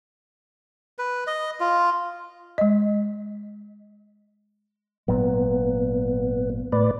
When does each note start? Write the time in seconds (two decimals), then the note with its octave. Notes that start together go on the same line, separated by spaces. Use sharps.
0.98 B4
1.27 D#5
1.60 F4
2.58 G#3 D#5
5.08 G#1 A#2 F#3 B3
6.72 A2 B4 D5